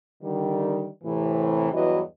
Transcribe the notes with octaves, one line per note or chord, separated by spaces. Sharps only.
D3 D#3 G3
A2 C3 E3
E2 G2 E3 F#3 F#4 D#5